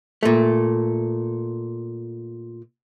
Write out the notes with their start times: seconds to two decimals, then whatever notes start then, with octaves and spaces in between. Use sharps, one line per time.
0.23 A#2 A3